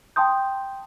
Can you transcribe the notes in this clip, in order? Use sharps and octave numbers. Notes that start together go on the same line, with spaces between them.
G5 A5 C6 D#6 G6